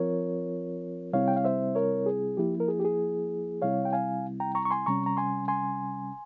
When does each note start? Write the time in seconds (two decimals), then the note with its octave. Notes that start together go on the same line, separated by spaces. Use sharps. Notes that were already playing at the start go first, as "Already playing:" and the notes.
Already playing: F3 C4 F4 A#4 C#5
1.13 C3 G3 C4 E4 C#5 F5
1.28 G5
1.36 F5
1.45 C5 E5
1.75 A#4 C#5
2.06 G#4
2.37 F3 A#3 E4 G4
2.60 A#4
2.68 G#4
2.80 G4
2.84 G#4
3.62 C3 G3 C4 E4 C#5 F5
3.85 G5
3.93 F5 G#5
4.40 G5 A#5
4.55 A#5 C#6
4.65 C#6
4.71 G#5 C6
4.86 C3 G3 C#4 A#5 C#6
5.06 A#5
5.17 G#5 C6
5.48 G#5 C6